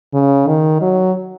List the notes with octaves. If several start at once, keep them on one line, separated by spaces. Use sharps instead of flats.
C#3
D#3
F#3